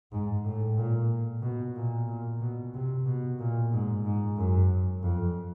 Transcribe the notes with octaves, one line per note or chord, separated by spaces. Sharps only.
G#2
A2
A#2
B2
A#2
A#2
B2
C3
B2
A#2
G#2
G#2
F#2
F2